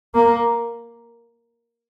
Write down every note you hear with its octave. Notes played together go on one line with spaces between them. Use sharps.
A#3